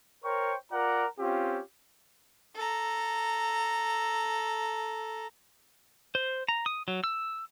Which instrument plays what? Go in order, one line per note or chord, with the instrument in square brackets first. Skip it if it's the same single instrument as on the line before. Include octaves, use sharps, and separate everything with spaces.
[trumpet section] A#4 C5 C#5 G5 C#6
F4 A#4 D5 F#5 A#5
C4 C#4 F4 G4
[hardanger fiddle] A4 A#5
[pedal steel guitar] C5
A#5
D#6
F#3
E6